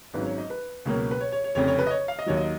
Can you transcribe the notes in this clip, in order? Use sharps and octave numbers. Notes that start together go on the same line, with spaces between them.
G#1 G#2 F#3 C#4 B4
C#5
D#5
B4
C#2 B2 F#3 A#3 C#4
B4
C#5
C#5
C#5
F1 F2 C#3 C#5
C#5
B4
D#5
C#5
F5
D#5
D#2 D#3 F#3 C#5
D#5